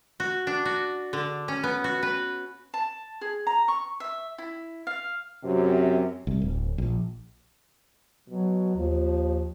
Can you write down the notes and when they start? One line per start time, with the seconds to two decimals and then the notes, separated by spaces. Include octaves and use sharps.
0.20 F#4
0.47 D4
0.65 F#4
1.13 D3
1.48 C#4
1.63 B3
1.84 F#4
2.03 B4
2.74 A5
3.21 G#4
3.47 A#5
3.68 C#6
4.00 E5
4.38 E4
4.87 F5
5.42 F#2 C3
6.27 C2
6.42 D1
6.78 A#1
8.28 B2 F#3
8.76 D#2 F3